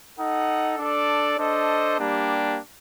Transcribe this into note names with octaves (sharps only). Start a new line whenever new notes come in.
D#4 A4 D#5 F#5
D4 A4 D5
D4 A4 C5 D#5
G3 A#3 D4 G4